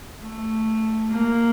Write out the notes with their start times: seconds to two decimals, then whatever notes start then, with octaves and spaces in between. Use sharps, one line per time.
0.22 A3
1.11 A#3